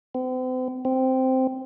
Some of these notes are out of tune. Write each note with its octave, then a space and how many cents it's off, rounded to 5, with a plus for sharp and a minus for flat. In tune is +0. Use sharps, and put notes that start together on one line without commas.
C4 -40
C4 -5